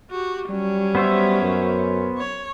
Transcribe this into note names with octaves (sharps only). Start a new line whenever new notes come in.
F#4 G4
F#3 G3 C#4
B3 C5 E5
F#2
C#5